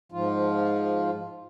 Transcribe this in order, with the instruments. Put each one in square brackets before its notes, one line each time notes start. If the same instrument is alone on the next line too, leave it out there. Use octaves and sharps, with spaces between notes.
[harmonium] G#2 F3 F4